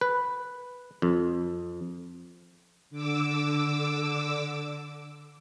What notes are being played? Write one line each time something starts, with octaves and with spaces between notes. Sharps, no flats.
B4
F2
D3 D6 E6